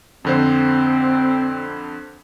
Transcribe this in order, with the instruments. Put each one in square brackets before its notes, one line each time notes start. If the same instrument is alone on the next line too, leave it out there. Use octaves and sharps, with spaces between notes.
[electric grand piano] F2 D3 C5 [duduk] C4